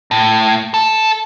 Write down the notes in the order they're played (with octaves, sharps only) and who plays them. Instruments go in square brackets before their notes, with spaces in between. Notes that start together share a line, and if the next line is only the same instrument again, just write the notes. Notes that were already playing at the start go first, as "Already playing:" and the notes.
[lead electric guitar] A2
A4